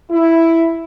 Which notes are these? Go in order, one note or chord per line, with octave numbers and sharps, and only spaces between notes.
E4